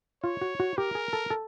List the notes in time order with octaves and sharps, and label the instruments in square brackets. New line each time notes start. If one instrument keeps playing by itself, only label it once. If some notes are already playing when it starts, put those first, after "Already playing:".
[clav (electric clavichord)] F4 [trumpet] C#5
[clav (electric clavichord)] F#4
F#4
[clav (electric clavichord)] G4 [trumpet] A#4
[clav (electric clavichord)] G#4
A4
A4